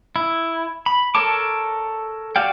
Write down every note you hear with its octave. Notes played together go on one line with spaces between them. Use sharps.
E4
B5
A4 A#4 C#5 A5 D6
F#4 G4 D5 F5 G5